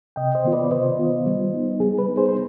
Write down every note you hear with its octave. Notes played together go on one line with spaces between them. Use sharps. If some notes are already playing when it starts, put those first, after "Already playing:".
C3 D#5 G5
C5 D#5
D#3 B3 F4
B4 D5
C3 C5 D#5
D#3 B3 F4
G3
B3 D#4
G3 G#4
B4
B3 D#4
G#4 C5
C5